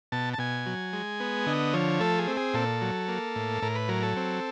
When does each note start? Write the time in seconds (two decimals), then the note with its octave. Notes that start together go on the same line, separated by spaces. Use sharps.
0.12 B2 A5
0.34 A5
0.38 B2 G#5
0.66 F#3
0.93 G#3
1.20 B3
1.47 D3 D#5
1.74 F3 C#5
2.00 A3 A4
2.19 G#4
2.28 C4
2.37 G#4
2.54 A#2 A4
2.82 F#3
3.09 A#3
3.36 A2
3.62 A2 A#4
3.75 B4
3.88 F#3 A#4
4.03 A4
4.17 C4